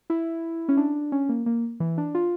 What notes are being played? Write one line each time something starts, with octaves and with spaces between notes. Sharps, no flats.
E4
C#4
D4
C#4
A#3
A#3
E3
D4
F4